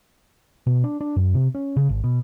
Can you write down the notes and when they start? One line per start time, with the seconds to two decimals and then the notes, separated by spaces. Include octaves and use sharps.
0.67 B2
0.84 D4
1.01 D4
1.16 F#2
1.34 C3
1.55 C#4
1.77 C#3
1.89 G#1
2.04 B2